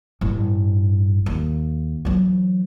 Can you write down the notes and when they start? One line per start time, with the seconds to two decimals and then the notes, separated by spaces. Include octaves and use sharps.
0.21 A1 G2
1.26 D#2
2.05 E3 F#3